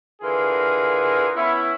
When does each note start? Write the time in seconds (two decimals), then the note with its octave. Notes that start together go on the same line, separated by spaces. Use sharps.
0.22 D3 E3 F4 G#4 A#4
1.35 B3 C#4 E4